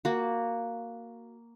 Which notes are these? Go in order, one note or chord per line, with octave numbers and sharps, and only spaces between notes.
A#3 F#4